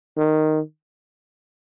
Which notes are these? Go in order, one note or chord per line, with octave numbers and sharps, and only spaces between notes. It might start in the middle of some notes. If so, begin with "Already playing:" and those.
D#3